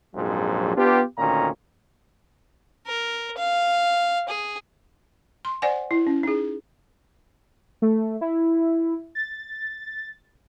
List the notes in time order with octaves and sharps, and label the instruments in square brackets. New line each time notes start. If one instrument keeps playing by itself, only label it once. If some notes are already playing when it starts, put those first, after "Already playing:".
[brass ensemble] A#1 F2 G#2 F#3
B3 D4 F4 G4
D2 A#2 D#3 C#4 A#5
[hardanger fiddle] A#4
F5
G#4
[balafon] C6
C5 D5 F#5 G#5
E4
C#4
D#4 G#4
[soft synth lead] A3
E4
A6